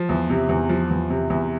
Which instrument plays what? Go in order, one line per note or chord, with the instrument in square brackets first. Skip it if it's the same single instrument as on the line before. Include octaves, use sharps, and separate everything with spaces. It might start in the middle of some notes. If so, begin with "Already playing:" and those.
Already playing: [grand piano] F3
E2
C3
E2
F3
E2
C3
E2